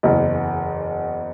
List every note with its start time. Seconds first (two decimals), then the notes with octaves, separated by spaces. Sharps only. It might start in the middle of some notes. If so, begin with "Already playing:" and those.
0.03 F#1 E2